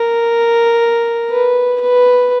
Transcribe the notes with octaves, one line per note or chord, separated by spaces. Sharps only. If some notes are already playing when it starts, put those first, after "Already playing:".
Already playing: A#4
B4
B4